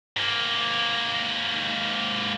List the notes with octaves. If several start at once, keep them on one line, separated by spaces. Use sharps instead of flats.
G#2 A#3